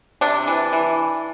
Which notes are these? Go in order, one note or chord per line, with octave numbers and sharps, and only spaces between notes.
C3 D4
E3
E3